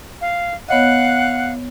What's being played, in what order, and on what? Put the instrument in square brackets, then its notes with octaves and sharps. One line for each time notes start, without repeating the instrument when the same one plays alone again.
[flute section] F5
[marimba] B3 C#5 D#5 [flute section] F5 F#5 F#6